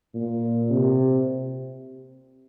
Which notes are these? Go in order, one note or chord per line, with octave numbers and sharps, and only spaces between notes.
A#2
C3